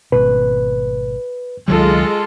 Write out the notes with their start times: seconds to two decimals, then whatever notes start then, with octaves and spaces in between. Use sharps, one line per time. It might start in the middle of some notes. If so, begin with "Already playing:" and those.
0.12 G#1 B2 B4
1.68 C#2 D#3 F#3 G#3 F4 A4